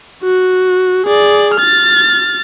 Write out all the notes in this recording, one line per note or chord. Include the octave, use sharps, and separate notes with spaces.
F#4
G#4 D5
F6 A6